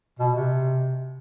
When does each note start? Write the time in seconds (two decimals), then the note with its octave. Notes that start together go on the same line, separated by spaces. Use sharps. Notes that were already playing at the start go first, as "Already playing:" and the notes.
0.19 B2
0.35 C3